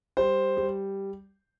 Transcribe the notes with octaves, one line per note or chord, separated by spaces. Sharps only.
G3 C5
G3